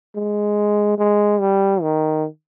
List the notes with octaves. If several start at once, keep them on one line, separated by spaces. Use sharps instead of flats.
G#3
G#3
G3
D#3